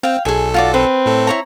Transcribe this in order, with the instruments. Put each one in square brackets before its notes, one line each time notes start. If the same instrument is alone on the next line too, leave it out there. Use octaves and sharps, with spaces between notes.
[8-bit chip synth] C4 [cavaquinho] F5 G5
[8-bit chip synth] B1 A4 [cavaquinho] G#4 G#5
[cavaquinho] F4 F#4 D5
[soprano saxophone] C4 [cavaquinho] B4
[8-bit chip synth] A2 A4
[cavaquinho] E4 C#5 A#5